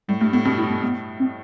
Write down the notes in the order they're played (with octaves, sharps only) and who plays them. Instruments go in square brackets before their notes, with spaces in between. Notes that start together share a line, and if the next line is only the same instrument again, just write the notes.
[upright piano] A2 [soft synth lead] G3
[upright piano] G2 [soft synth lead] A3
[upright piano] A2 [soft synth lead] B3
[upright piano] G2 B2 [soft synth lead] C4
[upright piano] A2 [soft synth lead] E4
[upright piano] A2 [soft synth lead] B3
[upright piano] A2 [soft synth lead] B3
[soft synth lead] C4